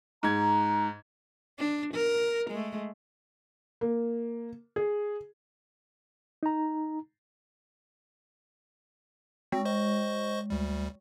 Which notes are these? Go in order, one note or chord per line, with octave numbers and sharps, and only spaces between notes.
G#2 A#5 G#6
D4
A#4
G#3 A3
A#3
G#4
D#4 A#5
G#3 C4
C5 D#5 C#6
D2 G3